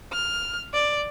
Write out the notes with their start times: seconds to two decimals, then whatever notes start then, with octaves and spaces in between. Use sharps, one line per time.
0.13 F6
0.74 D5